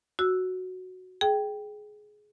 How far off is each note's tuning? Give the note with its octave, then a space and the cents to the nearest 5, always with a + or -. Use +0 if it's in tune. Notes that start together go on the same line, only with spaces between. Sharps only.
F#4 +0 E6 +0
G#4 +15 G5 +0